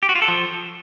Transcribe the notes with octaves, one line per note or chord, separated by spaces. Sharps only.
G4
F#4
F4
A4
F3